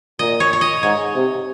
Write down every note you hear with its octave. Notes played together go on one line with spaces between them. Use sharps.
A#2 D#5
C#5
C#5
D#5
G#2 C#5
C3